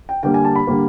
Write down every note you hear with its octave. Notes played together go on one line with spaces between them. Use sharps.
G5
D3 G3 A#3 G5
G#5
A5
B5
D3 G3 A#3